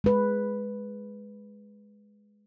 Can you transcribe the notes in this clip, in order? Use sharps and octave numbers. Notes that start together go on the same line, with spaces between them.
G#3 B4